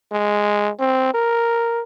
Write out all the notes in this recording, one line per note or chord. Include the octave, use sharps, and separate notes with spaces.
G#3
C4
A#4